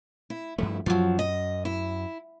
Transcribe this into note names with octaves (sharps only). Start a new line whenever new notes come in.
E4
G2 F3 A3 E4
F#2 F3 F#3
D#5
E4